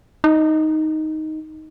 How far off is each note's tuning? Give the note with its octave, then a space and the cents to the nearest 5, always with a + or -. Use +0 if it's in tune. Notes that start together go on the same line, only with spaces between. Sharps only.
D#4 +5